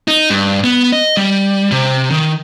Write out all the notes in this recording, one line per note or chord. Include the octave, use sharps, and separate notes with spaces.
D#4
G2
B3
D#5
G3
C3
D#3